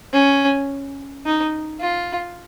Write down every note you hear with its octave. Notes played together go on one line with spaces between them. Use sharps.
C#4
D#4
F4